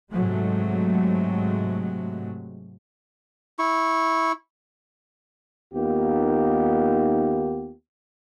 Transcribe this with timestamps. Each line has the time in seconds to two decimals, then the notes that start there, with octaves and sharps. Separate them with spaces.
0.13 G#2 C3 F#3 G#3 A3
3.59 E4 C#6
5.74 D#2 A#3 B3 D#4 F4 G4